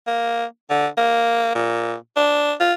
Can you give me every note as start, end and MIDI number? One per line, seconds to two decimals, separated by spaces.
0.07 0.45 58
0.70 0.87 50
0.97 1.52 58
1.55 1.95 46
2.17 2.53 62
2.60 2.73 65